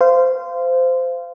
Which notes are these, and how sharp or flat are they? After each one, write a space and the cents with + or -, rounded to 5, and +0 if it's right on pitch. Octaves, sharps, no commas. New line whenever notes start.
C5 -20 F5 -20